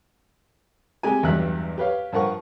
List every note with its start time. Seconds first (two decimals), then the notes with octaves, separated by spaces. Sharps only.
1.03 C3 G#3 G4 G#5
1.23 B1 E2 G2 G4 E5 F#6
1.78 G4 B4 C#5 F5
2.12 G2 F3 A#4 F#5 C#6